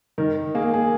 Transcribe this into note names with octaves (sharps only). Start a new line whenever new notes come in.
D#3 A#4
A#3 G#4
G#4